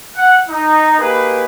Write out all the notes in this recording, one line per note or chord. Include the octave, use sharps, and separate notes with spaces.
F#5
D#4
A#3 D#4 G4 G#4 B4